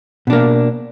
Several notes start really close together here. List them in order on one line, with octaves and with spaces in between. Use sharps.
B2 D4 A#3